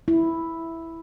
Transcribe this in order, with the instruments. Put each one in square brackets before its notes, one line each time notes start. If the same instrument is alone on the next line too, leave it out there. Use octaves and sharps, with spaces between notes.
[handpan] E4